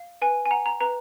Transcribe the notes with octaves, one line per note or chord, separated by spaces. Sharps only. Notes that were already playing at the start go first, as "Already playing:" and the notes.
Already playing: F5
B4 G#5
G#5
F#5 A#5
A#5
B4 A#5